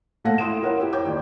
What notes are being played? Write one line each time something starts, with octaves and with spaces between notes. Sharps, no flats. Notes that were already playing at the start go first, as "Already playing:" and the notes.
A#2 A3 A4 F5 F#5 A#6
E4 G5 C6 D#6 D7 E7
E4 F4 A#4 C#5 F#5
E4 G4
C5 C#5 G5 D6 G6
D#2 D#3 D5